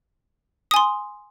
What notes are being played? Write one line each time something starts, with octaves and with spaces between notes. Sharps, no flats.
G#5 C6 D#6